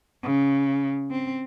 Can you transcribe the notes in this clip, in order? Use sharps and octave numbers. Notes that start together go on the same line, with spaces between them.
C#3
C4